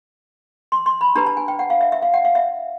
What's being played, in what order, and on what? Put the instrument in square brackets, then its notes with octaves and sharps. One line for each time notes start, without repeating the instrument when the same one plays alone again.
[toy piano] C6
C6
B5
D4 G4 B4 A#5
A5
G#5
G5
F#5
F5
E5
E5
F5
F#5
F5
E5